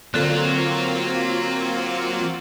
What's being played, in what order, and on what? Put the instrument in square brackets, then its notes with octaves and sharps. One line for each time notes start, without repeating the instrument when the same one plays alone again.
[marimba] D3 A4 [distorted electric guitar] F#3 [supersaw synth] A#3 C4 F4